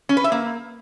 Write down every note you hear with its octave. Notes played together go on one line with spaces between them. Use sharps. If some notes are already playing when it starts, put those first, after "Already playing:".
C#4
B4
E5
A#3